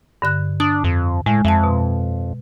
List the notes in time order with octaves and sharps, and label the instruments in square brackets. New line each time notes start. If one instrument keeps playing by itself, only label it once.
[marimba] G2 D3 F#6
[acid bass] D4 [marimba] D#6
[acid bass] F2
[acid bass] A2 [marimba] G#3
[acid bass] F2 [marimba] E5 A5
[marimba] B2